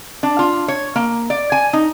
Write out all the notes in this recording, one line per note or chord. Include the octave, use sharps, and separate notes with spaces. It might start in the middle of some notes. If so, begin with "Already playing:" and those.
D4
F4
C#5
A#3
D5
G#5
D#4